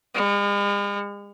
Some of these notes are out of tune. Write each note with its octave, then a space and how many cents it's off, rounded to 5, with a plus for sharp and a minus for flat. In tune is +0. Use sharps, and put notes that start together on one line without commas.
G#3 -45